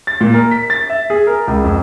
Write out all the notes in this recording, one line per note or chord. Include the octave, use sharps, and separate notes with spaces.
A6
A#2
A#4
B6
A6
E5
G#4
A#4
C#2
F2